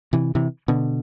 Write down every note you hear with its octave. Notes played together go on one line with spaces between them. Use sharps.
C3 E3
C3 E3
B2 D3